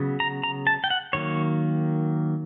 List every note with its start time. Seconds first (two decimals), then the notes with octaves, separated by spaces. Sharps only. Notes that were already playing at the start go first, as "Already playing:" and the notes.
Already playing: C#3 F#3 B3
0.20 A#5
0.43 A#5
0.67 A5
0.84 G5
0.90 F#5
1.13 D#3 F#3 A#3 C#5